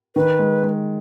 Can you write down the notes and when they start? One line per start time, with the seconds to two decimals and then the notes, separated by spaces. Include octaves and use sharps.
0.16 D#3 B4
0.39 G#3
0.63 G#3